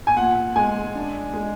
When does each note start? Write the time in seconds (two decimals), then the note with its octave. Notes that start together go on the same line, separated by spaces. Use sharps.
0.07 G#5
0.16 A#2 F#5
0.56 G#3 G#5
0.95 D4
1.34 G#3